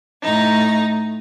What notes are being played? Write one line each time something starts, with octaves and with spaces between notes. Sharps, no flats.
A2 D#4 A#5